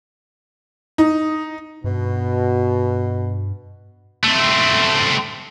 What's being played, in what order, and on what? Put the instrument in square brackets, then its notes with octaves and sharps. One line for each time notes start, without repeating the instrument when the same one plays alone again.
[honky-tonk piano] D#4
[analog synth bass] G2 [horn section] B2
[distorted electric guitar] A3 C4